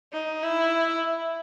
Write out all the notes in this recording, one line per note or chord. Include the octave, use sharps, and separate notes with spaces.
D#4
E4